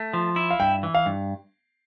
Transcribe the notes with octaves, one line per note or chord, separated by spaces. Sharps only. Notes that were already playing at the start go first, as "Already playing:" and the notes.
Already playing: A3
F3
E4
F5
G2 G5
E3
F5
G2